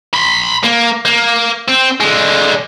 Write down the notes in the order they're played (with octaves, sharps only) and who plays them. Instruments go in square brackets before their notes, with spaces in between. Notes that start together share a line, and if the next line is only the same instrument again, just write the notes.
[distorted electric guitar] B5 C6
A#3
A#3
C4
D3 G#3